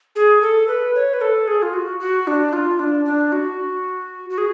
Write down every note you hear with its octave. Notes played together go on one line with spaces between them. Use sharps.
G#4
A4
B4
C#5
B4
A4
G#4
F4
F#4
F#4
D4
F4
D4
D4
F#4
F#4
G#4